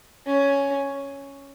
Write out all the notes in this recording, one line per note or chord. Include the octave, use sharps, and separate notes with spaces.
C#4